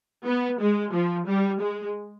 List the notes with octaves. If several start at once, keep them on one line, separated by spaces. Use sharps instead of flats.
B3
G#3
F3
G3
G#3